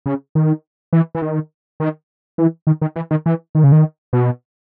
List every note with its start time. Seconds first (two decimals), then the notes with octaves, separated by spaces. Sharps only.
0.06 C#3
0.35 D#3
0.93 E3
1.15 E3
1.22 D#3
1.80 D#3
2.38 E3
2.67 D#3
2.82 D#3
2.96 E3
3.11 D#3
3.26 E3
3.55 D#3
3.64 C#3
3.72 D#3
4.13 B2